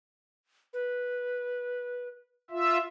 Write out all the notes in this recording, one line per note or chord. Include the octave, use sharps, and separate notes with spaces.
B4
F4 E5